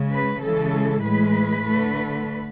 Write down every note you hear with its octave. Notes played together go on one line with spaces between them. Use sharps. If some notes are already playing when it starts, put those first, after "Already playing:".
Already playing: C#3 G#3
B4
C#3 E3 G#3 A4
A2 E3 G#3 B4
D3 A3